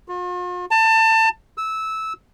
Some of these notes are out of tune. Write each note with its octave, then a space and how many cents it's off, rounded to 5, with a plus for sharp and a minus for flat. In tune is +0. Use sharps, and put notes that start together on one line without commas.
F4 +45
A5 +25
E6 -15